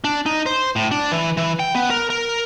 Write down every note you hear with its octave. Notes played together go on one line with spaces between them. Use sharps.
D4
D#4
C5
A2
D4
E3
E3
G5
B3
A#4
A#4